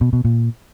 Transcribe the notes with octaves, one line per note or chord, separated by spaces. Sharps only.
B2
B2
A#2